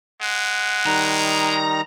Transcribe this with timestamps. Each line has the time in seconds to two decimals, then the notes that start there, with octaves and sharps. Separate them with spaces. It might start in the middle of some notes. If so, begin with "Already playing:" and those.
0.22 G#3 F#5
0.86 D#3 G3 D#4 A#5